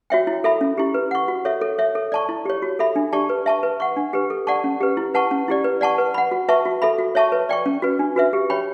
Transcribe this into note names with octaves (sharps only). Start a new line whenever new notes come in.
F#4 C#5 E5 G5
E4
A4 E5 B5
C#4
E4 G4
B4
F#5 C#6
F#4
A4 C#5 E5
A4
C#5 E5
A4
D5 A5 C#6
E4
G4 C#5
F#4
A4 E5 B5
D4
G4 D5 A5 C#6
B4
E5 A5 C#6
B4
F#5 C#6
D4
G4 B4
A4
D5 F#5 A5 C#6
C#4
G4 B4
E4
B4 F#5 A5 C#6
C#4
E4 G4 D5
B4
D5 F#5 A5 C#6
B4
F#5 B5
F#4
B4 E5 A5 C#6
F#4
A4 E5 B5
F#4
C#5 E5 A5 C#6
B4
D5 G5 C#6
C#4
F#4 B4
D4
F#4 B4 E5
G4
C#5 G5 B5